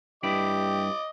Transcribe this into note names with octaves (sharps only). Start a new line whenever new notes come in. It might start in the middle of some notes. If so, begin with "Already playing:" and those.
G2 E4 G4 D5 D#5 D6